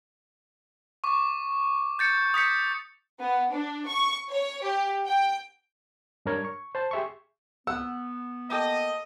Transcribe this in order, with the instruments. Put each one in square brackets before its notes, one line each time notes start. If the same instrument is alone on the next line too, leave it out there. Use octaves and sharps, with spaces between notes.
[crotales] C#6 D6
G6 A6 C#7
D#6 G6 B6 C#7
[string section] B3
D4
C#6
C#5
G4
G5
[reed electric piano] G2 D4 A#4 C#5 G#6
C#6
C5 A5
G4 G#4 E5 C6 C#6
[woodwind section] B3 [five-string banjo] F#5 [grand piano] E6
[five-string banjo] A#3 G4 A4 [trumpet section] D#5